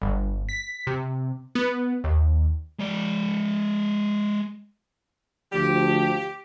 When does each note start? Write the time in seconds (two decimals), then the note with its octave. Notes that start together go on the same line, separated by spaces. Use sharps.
0.01 G1
0.49 B6
0.87 C3
1.55 B3
2.04 D#2
2.79 G#3 D5
5.53 D2 F3 G4